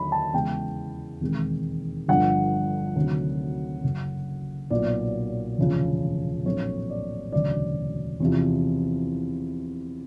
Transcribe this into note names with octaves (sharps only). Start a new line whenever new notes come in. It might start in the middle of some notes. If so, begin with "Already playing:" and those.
Already playing: D#2 D3 F#3 B5
A5
E2 C#3 E3 G#3 B3 G5
E1 D#2 D#3 G#3 C4
G1 G2 D3 F3 F#5
D2 C3 D#3 F#3
F#1 F#2 C#3
B1 A#2 F#3 B3 D5
E1 D2 C#3 F3
A#1 A2 F#3 A3 C4 C#5
D5
E1 D2 C#3 F#3 D5
E2 C3 F3